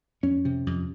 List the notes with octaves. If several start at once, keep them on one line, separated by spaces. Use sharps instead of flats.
F2 C#4
C3
F2